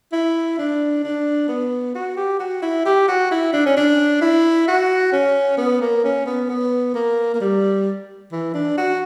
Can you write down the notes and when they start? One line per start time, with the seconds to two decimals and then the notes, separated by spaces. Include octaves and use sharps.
0.12 E4
0.58 D4
1.03 D4
1.48 B3
1.95 F#4
2.17 G4
2.40 F#4
2.62 E4
2.85 G4
3.08 F#4
3.31 E4
3.53 D4
3.66 C#4
3.77 D4
4.21 E4
4.68 F#4
5.12 C#4
5.58 B3
5.81 A#3
6.04 C#4
6.26 B3
6.49 B3
6.95 A#3
7.34 A#3
7.41 G3
8.32 E3
8.54 D4
8.77 F#4